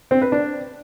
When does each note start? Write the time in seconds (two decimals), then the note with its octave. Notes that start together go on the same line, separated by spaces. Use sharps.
0.11 C4
0.22 B4
0.32 D4